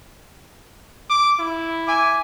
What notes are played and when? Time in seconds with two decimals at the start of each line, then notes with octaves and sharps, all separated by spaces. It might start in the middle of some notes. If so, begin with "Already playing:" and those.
1.10 D6
1.39 E4
1.88 E5 G#5 D6